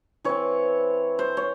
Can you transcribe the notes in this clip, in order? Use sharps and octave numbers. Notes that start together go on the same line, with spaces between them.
E3 C4 C#5
C5
C#5